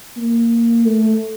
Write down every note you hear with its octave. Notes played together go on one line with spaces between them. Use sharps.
A#3
A3